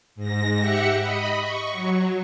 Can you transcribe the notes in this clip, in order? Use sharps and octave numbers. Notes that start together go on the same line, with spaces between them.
G#2 A#6
G4 E5 F#5 C#7
D#5 B5
C#6
F#3